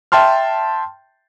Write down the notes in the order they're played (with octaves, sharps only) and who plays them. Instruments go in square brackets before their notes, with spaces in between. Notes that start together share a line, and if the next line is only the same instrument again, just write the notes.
[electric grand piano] E5 G5 A5 C6 F6